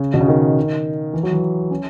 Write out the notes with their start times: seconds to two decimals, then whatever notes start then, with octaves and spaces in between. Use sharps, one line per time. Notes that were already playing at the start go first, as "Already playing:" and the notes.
Already playing: C#3
0.14 B2
0.21 C#3
0.28 D#3
1.13 E3
1.23 F#3
1.32 E3
1.71 C#4